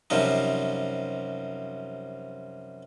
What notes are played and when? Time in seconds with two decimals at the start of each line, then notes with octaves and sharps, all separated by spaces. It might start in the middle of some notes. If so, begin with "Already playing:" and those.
0.10 F#2 C3 F3 G3 D#4